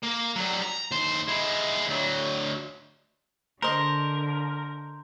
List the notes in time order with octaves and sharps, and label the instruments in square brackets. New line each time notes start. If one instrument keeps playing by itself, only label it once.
[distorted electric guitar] A#3
F#3 G3
A#5
D#2 C5
G#3 E4
D2 F#3
[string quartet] D3 [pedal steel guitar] A#4 [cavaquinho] C5 D#5 [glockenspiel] A#5 C6 G6